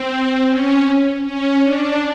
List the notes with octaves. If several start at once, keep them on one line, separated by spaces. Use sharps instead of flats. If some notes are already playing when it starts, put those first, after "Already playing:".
Already playing: C4
C#4
C#4
D4